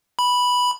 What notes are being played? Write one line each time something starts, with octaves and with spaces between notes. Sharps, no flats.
B5